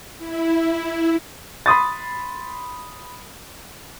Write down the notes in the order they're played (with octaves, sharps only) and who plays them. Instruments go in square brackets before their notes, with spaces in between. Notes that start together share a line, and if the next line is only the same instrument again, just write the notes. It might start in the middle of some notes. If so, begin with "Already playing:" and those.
[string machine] E4
[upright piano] B5 C6 D#6 A6